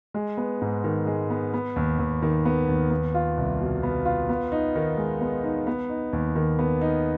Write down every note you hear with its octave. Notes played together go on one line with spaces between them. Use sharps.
G#3
B3
G#2
D#3
G#3
B3
B3
D#2
D#2
D#3
B3
D#2
B3
F4
C2
B2
B3
F4
B3
D#4
D#3
G#3
B3
D#4
B3
D#4
D#2
D#3
B3
D#4